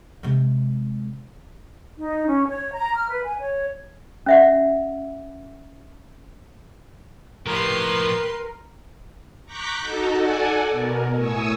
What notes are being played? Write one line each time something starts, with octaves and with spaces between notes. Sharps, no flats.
C3 G#3
D#4
C#4
C#5
A#5
F6
B4
G#5
C#5
C#4 E5 F#5
A2 F3 G4 A#4 B4 C6
A#5 C#6 D6 F#6 G6 B6
D#4 F#4 A4
A4 D5 F#5 G#5
B2 A#4
A2 G#5 C#6 D#6 E6